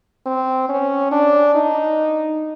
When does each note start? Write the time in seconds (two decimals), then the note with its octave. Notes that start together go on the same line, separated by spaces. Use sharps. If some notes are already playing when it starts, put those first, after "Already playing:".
0.26 C4
0.69 C#4
1.12 D4
1.55 D#4